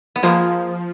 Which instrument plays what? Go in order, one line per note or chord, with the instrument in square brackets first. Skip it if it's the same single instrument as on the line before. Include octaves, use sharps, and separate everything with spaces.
[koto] B3
[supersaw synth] F3 [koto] G#3 A#3